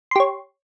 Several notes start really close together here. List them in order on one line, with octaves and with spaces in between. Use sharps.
C6 G4 C#5